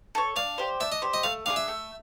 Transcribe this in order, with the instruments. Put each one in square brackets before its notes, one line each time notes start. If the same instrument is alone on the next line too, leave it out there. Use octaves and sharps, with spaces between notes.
[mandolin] A4 C#5
[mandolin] D4 [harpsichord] F5
[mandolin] G4 C5
[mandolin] D4 [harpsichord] E5
[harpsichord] D#5
[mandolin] G4 C5
[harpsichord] D#5
[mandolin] A3 [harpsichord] F5
[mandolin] D4 F4 G#4 [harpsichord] F5
[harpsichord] E5
[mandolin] A3